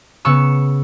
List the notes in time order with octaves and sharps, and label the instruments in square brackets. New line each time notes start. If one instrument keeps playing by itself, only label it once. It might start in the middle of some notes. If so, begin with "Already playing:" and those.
[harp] C#3 B3 C#6 E6